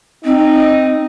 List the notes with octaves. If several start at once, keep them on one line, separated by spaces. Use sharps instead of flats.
C4 D#4